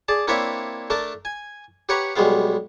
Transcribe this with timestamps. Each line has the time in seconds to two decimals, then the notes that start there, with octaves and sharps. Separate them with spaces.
0.08 G#4 D5 A5
0.28 A#3 C4 D4 E4 C#5 E5
0.90 A3 D4 A#4 A5
1.25 G#5
1.89 G4 B4 C#5 F#5 A#5 C#6
2.16 B1 G3 G#3 B3 F5